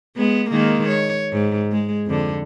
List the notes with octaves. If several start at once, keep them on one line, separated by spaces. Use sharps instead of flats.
G#3 B3
D#3 G#3 A#3
C#5
G#2
G#3
F2 D3